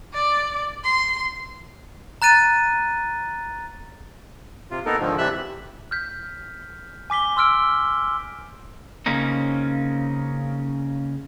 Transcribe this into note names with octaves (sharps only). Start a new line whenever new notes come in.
D5
C6
A#5 F#6 A6 D#7
C3 F4
A#3 B3 D#4 A4 A#4
G#2 D3 D#3 F3
C3 E3 G3 E5 E6 F#6
F6 G6 B6
G#5 D6 B6 G7
C6 E6 F6 D7
C#3 A#3 C4 C#4 D#4